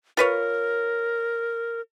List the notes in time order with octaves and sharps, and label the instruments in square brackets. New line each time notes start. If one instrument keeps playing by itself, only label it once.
[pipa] F4 B4 C#5 [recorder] A#4